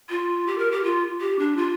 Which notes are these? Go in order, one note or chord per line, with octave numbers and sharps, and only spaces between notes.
F4
G4
A#4
G4
F4
G4
D4
F4